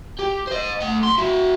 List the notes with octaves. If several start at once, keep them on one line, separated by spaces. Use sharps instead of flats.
G4
C5 D#5
A3 F#5
B1 C6
E4 F#4